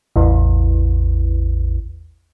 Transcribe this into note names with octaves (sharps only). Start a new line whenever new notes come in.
A1 E2